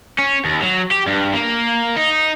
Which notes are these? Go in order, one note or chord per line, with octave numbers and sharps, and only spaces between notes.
C#4
D#2
F#3
G4
G2
A#3
D#4